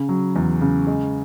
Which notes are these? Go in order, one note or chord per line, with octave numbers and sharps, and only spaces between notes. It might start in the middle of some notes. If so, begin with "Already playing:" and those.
Already playing: C#3
F#3
E2
C#3
G#3